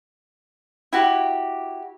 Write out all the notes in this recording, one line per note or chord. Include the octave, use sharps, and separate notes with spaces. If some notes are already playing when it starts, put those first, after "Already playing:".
E4 F#4 G4